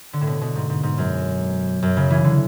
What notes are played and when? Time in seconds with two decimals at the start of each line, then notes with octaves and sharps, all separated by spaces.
0.13 D3
0.21 A2
0.27 B2
0.41 B2
0.56 G#2
0.70 G#2
0.83 G#2
0.98 F#2
1.82 F#2
1.97 C#3
2.10 E3
2.24 D3